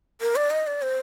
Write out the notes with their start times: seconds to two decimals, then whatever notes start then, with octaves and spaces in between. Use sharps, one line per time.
0.21 A#4
0.36 D5
0.50 D#5
0.67 D5
0.82 C5